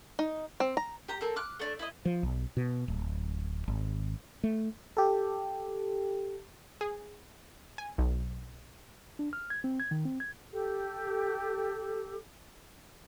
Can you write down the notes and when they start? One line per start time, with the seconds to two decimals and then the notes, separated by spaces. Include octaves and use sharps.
0.19 D#4
0.60 C4
0.77 A#5
1.08 G4 A#5
1.21 C4 A4 A#4
1.36 D6 F6 F#6
1.59 A3 D4
1.79 E4 B4 D#5
2.05 F3
2.23 B1
2.57 B2
2.88 D1
3.68 G#1
4.44 A3
4.97 G4 A4
6.81 G#4
7.78 G#5
7.98 B1
9.19 D4
9.33 F6
9.50 G#6
9.64 C4
9.80 G#6
9.91 D#3
10.05 C4
10.20 G#6
10.51 G4 A4